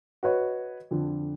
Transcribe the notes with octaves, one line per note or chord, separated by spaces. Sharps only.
F#4 B4 C#5 D#5
F2 D3